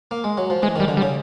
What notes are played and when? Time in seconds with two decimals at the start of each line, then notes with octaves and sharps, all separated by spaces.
0.11 A#3
0.24 G#3
0.38 F#3
0.50 F3
0.63 E3 G#3
0.76 D#3 G3
0.88 D3
0.97 G3
1.02 C#3